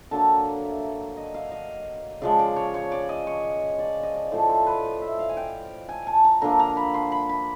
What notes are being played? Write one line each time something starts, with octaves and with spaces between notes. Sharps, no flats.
D3 F#3 A#3 A5
E5
D#5
F5
D#5
C#3 F3 G#3 D5
D5
C#5
C#5
D5
D#5
C#5
D5
D#5
D5
A2 F3 A3 C5
C5
B4
C5
E5
F5
G#5
G5
G#5
A5
A#5
D3 F3 A#3 A#5
A#5
B5
C6
B5
B5